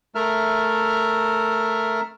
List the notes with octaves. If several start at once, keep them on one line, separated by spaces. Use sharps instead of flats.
A3 A#4 E5 F6